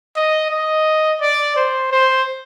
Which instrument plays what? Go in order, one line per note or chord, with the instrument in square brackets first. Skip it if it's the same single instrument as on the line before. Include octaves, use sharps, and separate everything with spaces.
[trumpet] D#5
D#5
D5
C5
C5